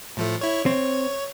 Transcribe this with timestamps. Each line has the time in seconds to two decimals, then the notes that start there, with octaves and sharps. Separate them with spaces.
0.17 A2 F3 A3
0.41 E4 C#5
0.66 C4 C#5